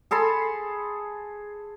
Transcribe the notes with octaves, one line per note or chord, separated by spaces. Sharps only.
G#4 A4 B5 C6